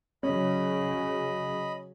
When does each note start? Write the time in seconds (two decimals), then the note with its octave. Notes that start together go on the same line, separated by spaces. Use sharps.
0.23 C#3 F#3 C#4 D#5 B5